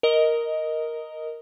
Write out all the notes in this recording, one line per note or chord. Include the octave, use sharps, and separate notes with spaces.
A#4 D#5